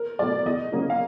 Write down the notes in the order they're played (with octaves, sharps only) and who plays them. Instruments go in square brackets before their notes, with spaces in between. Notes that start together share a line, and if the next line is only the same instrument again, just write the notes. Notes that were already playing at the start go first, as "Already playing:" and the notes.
Already playing: [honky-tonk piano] A#4
B2 F#3 A3 D5
E2 D#5
C#3 F#3 A#3 D#4
F5